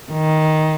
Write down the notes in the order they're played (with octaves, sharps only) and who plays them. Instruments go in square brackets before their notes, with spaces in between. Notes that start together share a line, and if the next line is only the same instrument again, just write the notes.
[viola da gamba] D#3